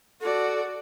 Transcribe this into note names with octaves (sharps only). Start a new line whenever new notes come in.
F#4 A4 D5